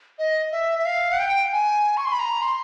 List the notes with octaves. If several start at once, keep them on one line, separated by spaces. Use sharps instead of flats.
D#5
E5
E5
F5
F#5
G5
G#5
C#6
C6
B5
A#5
C6